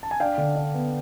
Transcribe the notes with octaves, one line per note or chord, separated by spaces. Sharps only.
A5
G#5
D4 F5 G5
D3
D4
B3